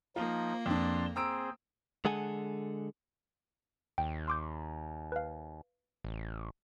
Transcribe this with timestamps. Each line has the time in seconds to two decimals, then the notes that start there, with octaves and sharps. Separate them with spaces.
0.16 F3 A#3 D#4 F4
0.66 F2 D4 A5 C6
1.16 C4 G#4 C5 A#5 E6 D7
2.05 D3 G#3 G#4 A4 F#5 G#5
3.98 D#2 G5
4.28 C6 D6 G6
5.12 B4 F5
6.04 A1